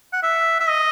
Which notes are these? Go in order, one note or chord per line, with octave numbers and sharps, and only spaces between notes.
F#5
E5
E5
D#5